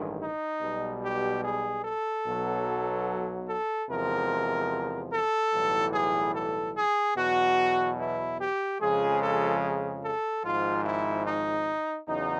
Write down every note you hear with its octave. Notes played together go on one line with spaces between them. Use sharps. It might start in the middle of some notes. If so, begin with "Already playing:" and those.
Already playing: A1 G2 D#3 G#3
D#4
B1 B2 G3
G4
G#4
A4
B1 B2 F#3
A4
E2 C3 F3 G#3 A#4
A4
B1 A2 E3 G3
G#4
A4
G#4
E2 B2 F#3 F#4
E4
G4
F2 C#3 F3 G#3 G#4
A4
A4
G#1 G#2 F3 F4
E4
D#4
E2 C#3 F#3 D#4